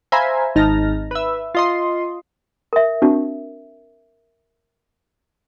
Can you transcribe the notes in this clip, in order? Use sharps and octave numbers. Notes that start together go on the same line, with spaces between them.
C5 E5 F5 G#5 A#5 B5
G#1 D#4 A5 F6 A#6
B4 E5
F4 D#5 C6
A#4 E5
C4 D4 F#4